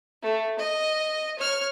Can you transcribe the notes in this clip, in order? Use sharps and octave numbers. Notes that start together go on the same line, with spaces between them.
A3
D#5
C#5 F6